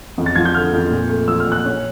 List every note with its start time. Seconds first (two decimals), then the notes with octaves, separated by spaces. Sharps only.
0.18 F2
0.26 A6
0.36 F3 G#6
0.45 G6
0.54 D3 F6
0.73 F2
0.91 A#2
1.09 A3
1.28 F3 E6
1.40 F6
1.46 A#2
1.52 F#6
1.65 C#4